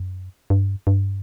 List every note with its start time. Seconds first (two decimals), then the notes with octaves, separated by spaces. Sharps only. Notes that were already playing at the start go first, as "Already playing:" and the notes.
Already playing: F#2
0.50 G2
0.87 G2